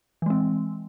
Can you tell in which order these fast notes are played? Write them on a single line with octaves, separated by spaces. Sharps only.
E3 G#3 C4